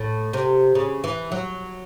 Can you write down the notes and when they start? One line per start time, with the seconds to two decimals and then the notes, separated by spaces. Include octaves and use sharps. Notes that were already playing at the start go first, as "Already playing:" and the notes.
Already playing: A2
0.33 C3
0.75 C#3
1.04 E3
1.32 F#3